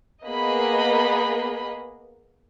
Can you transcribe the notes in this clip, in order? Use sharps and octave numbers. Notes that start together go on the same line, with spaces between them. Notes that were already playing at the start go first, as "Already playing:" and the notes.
A#3 B3 G#4 D#5 B5